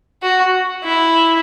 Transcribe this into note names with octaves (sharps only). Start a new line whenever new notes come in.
F#4
E4